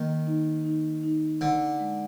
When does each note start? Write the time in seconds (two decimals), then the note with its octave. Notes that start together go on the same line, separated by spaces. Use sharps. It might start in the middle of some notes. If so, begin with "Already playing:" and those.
Already playing: D#3 A#3
0.27 D#4
0.65 D#4
1.04 D#4
1.41 D3 D#4
1.79 G#3